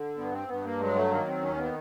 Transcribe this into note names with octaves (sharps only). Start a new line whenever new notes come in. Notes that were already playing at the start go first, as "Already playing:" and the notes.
Already playing: D3
G2 B3
C4
G2 B3
A#3
F#3 G#3
A3
D#3 A#3
C4
D#2 C#4
B3